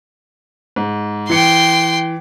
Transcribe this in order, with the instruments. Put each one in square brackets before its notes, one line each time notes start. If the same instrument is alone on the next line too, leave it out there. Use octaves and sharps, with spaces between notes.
[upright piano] G#2
[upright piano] E3 C#7 [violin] G5 C6